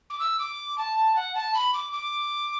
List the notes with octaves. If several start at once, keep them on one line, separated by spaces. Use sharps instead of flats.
D6
E6
D6
A5
F#5
A5
B5
D6
D6